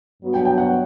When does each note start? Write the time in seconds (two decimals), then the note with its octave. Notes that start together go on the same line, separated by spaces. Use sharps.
0.21 G2 F#3 B3 F#4
0.34 G5
0.45 G5
0.58 F#5